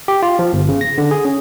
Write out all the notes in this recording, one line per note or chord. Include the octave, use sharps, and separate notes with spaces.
G4
F4
F3
G1
C#3
A#6
D3
G#4
C#4